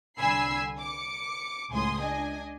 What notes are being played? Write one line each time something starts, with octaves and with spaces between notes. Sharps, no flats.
C2 D3 G#5 B5 E6 C7
D6 C#7
C#2 A2 G#5 C6 D#6
D4 D#5 G#5